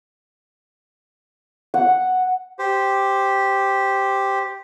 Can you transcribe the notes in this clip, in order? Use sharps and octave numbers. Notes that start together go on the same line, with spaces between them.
F#5
G4 C5